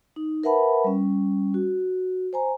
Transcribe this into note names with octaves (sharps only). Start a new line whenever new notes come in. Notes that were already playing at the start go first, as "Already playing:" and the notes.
D#4
A#4 B4 E5 F#5 A5 B5
G3 C#4
F#4
C5 G#5 A#5